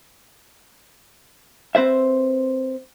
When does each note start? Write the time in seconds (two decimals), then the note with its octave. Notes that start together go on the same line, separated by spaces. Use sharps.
1.75 C4 B4 C5 E5